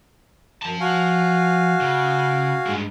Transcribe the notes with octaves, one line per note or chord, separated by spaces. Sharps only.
F#2 F3 A5
F#4 F5 G#5
C#3
G2 G#3